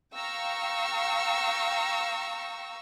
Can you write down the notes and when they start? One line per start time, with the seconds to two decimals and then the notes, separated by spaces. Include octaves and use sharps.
0.14 F5 G5 A#5 C#6 E6